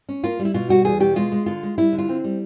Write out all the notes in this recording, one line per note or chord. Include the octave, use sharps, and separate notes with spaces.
C#4
A#3 F4
G3
E4
B2 F4
G3 F#4
E2 G#4
B2 G4
G#3 F4
G#3
D3 F4
G#3
G3 E4
D3
F4
C4
G3